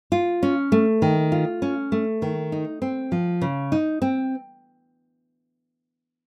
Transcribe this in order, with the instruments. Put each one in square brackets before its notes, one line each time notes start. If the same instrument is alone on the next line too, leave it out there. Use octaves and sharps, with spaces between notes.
[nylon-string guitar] F4
C#4
A3
D#3
F4
C#4
A3
D#3
D#4
C4
F3
C#3
D#4
C4